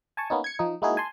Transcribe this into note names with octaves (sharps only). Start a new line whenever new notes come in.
G#5 A5 C#6
A#3 B3 C#4 D#4
G#6 C#7
F3 D#4
G#3 A#3 D#4 E4 F#4 G#4
G#5 A5 C6